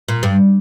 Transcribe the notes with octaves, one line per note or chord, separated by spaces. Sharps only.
A#2
G2